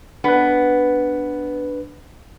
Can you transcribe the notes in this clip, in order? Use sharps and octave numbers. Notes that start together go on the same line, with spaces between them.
B3 D4 B4